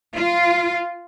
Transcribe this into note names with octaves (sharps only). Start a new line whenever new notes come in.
F4